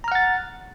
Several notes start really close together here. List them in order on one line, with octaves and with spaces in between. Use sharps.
A#5 F6 F#5 A6